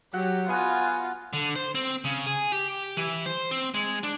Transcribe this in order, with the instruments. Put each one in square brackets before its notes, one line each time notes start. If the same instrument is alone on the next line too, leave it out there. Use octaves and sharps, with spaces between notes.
[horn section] F#3 [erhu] G4 [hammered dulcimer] F#5
[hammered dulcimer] B3 F#4 [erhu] F4 [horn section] G#5
[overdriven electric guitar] D3
C5
C4
C#3
G#4
G4
E3
C5
C4
G#3
D4